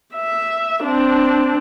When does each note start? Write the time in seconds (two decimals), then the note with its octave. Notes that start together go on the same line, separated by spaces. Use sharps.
0.15 E5
0.84 C4 D4